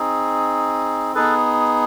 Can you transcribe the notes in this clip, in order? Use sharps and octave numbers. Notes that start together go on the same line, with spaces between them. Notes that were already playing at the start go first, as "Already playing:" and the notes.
Already playing: C4 D#4 G#4
B3 D#4 G#4 A4 B4